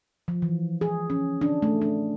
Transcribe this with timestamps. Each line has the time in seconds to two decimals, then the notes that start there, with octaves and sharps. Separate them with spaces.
0.28 F3
0.42 E3
0.81 G#4
1.10 C#4
1.41 D4
1.62 A3
1.82 D4